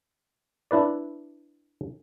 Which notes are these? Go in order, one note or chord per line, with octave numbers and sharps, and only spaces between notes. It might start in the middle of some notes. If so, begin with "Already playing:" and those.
D4 E4 B4 D5